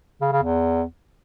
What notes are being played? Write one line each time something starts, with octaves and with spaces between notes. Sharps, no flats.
C#3
C#3
E2